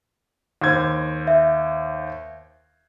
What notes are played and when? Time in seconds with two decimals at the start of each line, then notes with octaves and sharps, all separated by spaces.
0.61 D#2 C5 G#6
1.27 E5